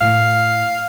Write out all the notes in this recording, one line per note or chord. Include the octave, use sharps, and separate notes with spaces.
A2 A3 F5